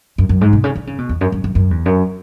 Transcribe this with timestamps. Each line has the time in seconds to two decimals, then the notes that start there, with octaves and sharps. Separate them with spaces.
0.18 F#2
0.29 F#2
0.41 G#2
0.53 B2
0.64 C#3
0.75 D3
0.87 C#3
0.98 B2
1.09 E2
1.21 F#2
1.32 F#2
1.44 F#2
1.55 F#2
1.71 E2
1.86 F#2